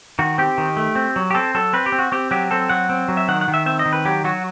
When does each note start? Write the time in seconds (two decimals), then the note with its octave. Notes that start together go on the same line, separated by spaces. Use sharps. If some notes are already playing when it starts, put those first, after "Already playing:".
0.19 D#3 F#4
0.38 C4 G4
0.58 D#3
0.77 A3
0.95 C4
1.16 F#3
1.31 G4
1.35 C4 A4
1.55 F#3 A4
1.73 C4 B4
1.86 G4
1.92 C4
1.99 F#4
2.12 C4 G4
2.31 F#3 G4
2.51 C4 A4
2.69 F#3 F#5
2.89 C4
3.08 F#3
3.17 E5
3.28 D#3 F#5
3.41 F#5
3.48 D#3
3.54 E5
3.66 C4 E5
3.79 D#5
3.86 D#3
3.93 B4
4.05 F#3 G4
4.24 F#3 F#4